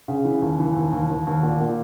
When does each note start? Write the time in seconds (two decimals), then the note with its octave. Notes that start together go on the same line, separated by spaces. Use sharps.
0.08 C#3
0.25 E3
0.42 D#2
0.60 E3
0.76 D#2
0.93 D#2
1.10 D#2
1.27 D#2
1.43 A#2
1.60 A#2